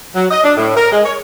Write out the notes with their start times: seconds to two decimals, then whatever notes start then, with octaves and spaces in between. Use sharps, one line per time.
0.15 F#3
0.31 D#5
0.44 D4
0.57 A2
0.77 A#4
0.92 G#3
1.05 C#5